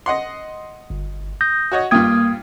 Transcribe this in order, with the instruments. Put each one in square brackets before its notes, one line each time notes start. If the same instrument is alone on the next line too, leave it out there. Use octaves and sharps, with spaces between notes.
[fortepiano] D#5 F#5 C6
[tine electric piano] G1
D#6 G6 A#6
[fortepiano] F#4 C#5 D#5
[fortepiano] G2 F4 G5 [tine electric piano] A#3 D#6 G#6